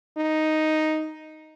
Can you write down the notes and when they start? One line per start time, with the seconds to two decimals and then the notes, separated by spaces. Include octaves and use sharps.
0.18 D#4